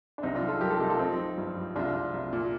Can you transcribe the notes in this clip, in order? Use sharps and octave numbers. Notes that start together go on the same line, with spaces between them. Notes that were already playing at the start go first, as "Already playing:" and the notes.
D4
C2 C4 D#4
D4 F4
G3
F4 A4
G3 G4 A#4
F4 A4
C2 D#4 G4
F4 A4
F3 C4 D#4
F3
G2
F3
C2 D4 F4
C2
C2
A#2